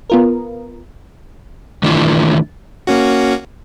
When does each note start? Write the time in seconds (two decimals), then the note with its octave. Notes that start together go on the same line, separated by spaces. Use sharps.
0.10 B3 F4 A#4
1.83 D#3 E3 A3 D4 E4 F4
2.87 A#3 C#4 F#4